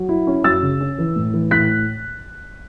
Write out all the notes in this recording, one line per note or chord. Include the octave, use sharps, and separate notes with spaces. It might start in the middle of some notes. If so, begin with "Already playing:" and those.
Already playing: F#3
E4
C#4
F#2 E6 A6
C#3
C#4
E3
A2
E3
A2 F#6 B6